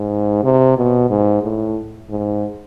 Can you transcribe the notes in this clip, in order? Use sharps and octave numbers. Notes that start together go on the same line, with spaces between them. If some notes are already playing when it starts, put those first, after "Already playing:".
Already playing: G#2
C3
B2
G#2
A2
G#2